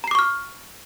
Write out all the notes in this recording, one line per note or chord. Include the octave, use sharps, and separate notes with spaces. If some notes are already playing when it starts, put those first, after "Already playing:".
A#5 C#6 D6 F6 C7